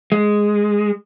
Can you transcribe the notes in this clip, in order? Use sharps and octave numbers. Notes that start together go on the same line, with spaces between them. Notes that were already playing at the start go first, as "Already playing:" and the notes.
G#3